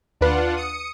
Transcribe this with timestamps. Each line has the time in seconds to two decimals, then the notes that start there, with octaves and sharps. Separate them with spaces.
0.21 D#2 D4 F4 B4 F#5
0.56 D#6 C#7